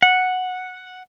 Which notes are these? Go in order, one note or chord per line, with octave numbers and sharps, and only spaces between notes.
F#5